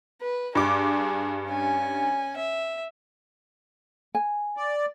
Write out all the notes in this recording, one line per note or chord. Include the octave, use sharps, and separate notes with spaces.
B4
G2 D4 G#4 D6
C#4 G#5
E5
G#5
D5